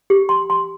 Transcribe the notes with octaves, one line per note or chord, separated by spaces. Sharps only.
G4
C6
C6